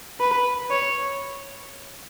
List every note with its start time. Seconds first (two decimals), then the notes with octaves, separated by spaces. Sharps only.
0.20 B4
0.71 C#5